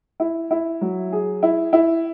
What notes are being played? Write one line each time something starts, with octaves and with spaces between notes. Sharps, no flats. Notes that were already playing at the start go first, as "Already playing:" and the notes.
E4
E4
F#3
G#4
E4
E4